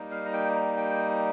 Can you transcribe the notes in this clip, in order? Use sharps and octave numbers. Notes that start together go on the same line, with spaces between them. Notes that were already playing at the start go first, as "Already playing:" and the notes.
Already playing: G3 A#3 D#4
F5
A#5
G5
A#5
G5